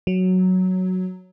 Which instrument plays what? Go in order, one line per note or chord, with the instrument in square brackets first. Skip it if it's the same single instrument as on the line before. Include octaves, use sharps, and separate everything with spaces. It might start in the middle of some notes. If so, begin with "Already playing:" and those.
[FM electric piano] F#3